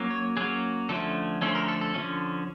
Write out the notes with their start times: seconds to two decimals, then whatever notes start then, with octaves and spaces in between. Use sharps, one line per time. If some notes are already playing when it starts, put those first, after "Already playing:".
Already playing: F#3 A#3 C#4
0.11 C#5
0.37 F#3 A#3 C#4 G#4
0.89 D3 F3 A3 C#4 A4
1.41 D3 F3 A3 C#4 A4
1.55 A#4
1.68 A4
1.81 A4
1.94 D3 F3 A3 C#4